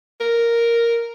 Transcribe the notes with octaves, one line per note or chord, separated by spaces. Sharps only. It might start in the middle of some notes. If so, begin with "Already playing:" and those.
A#4